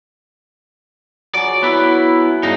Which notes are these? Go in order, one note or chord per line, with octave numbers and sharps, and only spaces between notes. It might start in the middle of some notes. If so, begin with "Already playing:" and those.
F#3 G#4 D5
B3 E4
G2 C#3 G#3 D#4